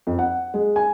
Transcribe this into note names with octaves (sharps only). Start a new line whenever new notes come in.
F2
F#5
G#3
G#5